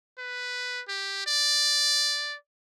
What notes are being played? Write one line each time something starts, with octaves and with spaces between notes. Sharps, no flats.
B4
G4
D5